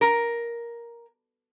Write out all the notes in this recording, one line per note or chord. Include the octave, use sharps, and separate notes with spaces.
A#4